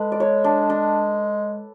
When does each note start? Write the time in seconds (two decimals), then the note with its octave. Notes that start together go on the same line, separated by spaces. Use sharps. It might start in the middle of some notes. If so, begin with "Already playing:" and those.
Already playing: G#3 A4 B4
0.12 D5
0.20 C#5
0.44 D4
0.70 D4